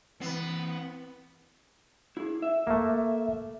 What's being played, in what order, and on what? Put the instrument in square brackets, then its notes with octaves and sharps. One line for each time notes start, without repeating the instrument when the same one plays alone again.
[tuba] E3 [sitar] B3 [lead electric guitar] C4 B4
[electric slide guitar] E4 G#4
E5
[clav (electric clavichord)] A3 A#3